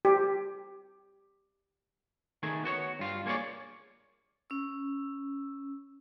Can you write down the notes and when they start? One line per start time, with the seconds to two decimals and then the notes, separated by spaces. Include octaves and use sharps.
0.05 G4
2.43 D#3 A3 G#4
2.64 B3 F#4 C5 C#5
2.99 G2 F4 F5
3.26 A#3 G#4 A4 C#5 D5
4.50 C#4 E6